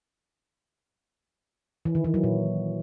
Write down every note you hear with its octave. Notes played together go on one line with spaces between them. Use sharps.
E3
D#3
E3
F#3
A#2